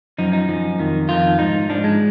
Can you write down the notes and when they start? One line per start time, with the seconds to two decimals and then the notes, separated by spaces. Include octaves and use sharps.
0.18 F#2 F3 D#4
0.33 D#4
0.49 F#2 F3
0.79 F2 D#3
1.09 F2 D#3 F4
1.39 G#2 F3 D#4
1.69 G#2 F3 D4
1.84 G#3